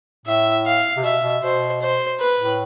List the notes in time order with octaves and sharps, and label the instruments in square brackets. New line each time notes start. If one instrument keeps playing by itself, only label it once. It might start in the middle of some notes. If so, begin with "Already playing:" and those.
[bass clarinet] A2 [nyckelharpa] E5
[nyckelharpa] F5
[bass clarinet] C3
[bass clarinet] B2 [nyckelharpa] E5
[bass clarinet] B2
[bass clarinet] B2 [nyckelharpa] C5
[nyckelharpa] C5
B4
[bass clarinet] A2